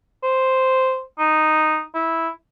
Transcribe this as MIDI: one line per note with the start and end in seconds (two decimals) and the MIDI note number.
0.23 1.01 72
1.19 1.81 63
1.94 2.29 64